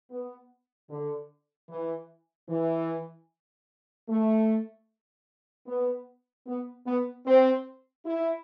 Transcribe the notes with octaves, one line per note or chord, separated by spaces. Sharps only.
B3
D3
E3
E3
A3
B3
B3
B3
C4
E4